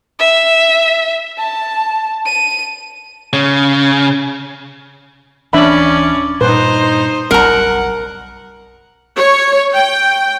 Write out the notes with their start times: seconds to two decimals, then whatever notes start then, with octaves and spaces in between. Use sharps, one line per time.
0.19 E5
1.38 A5
2.26 D#7
3.33 C#3
5.53 D1 E3 C#4 D4 D5 E5 B5
6.41 G2 A#2 D#4 B4 C5
7.31 F#1 B1 G3 A#4 F#5 A#5
9.17 C#5
9.74 G5